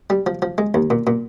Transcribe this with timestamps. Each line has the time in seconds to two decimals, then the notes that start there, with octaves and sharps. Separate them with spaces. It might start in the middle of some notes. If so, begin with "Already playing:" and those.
0.10 G3
0.26 F3
0.42 F3
0.58 G#3
0.74 D#2
0.90 A#2
1.07 A#2